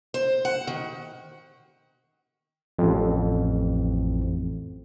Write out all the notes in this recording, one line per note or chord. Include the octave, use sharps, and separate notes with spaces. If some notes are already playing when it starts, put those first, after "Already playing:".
C5
F#5
D#3
A1 F2